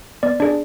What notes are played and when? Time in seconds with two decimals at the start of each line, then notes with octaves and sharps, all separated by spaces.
0.23 B3 D5
0.40 D4 G#4 D5